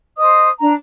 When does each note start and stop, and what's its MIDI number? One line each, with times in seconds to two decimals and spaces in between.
0.17 0.48 72
0.17 0.48 75
0.17 0.48 87
0.59 0.73 62
0.59 0.73 82